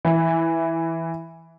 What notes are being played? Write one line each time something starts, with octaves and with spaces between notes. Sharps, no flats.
E3